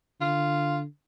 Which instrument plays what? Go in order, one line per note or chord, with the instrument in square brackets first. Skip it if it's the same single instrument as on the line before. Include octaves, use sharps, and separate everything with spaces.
[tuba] D3 [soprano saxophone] F4